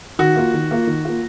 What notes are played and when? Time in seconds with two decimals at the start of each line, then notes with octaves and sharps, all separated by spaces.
0.19 D#3 F#4
0.36 A#3 F4
0.54 D#3
0.71 A#3 F4
0.87 D#3
1.05 A#3 F4